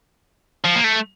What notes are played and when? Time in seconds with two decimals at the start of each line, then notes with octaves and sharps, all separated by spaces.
0.64 F3
0.76 A#3
0.84 A3